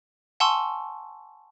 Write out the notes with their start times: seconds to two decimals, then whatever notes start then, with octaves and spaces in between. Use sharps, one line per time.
0.40 F#5 G#5 A5 C6 C#6 E6